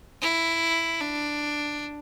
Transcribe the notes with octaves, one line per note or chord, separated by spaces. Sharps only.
E4
D4